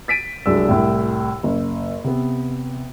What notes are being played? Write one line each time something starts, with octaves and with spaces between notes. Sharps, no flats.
A6 B6 D7 D#7
C2 F#3 G#3 D4 E6
C2 A2
F#1
C3 B3